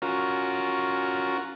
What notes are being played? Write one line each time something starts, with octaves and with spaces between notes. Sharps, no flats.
C#4 F4 F#4 A#4